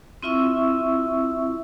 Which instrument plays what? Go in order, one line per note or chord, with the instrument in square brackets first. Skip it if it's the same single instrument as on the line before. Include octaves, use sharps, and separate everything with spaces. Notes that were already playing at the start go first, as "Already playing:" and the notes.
[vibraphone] C4 E4 F4 E5 C#6 E6